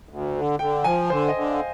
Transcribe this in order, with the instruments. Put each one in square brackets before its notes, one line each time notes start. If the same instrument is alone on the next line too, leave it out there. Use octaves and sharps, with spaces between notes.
[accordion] D2
D3
[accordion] D3 [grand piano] G5
[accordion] F3 [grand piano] G#5
[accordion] D3 [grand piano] C5
[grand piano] D#5
[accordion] D3
[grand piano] F5